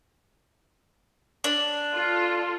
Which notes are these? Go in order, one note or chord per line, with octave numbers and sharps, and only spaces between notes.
D4
F4 A4